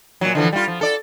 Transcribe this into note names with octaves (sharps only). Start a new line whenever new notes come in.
A#2 F#3
D3 E3 F3
G3 F4
F3
A4 D5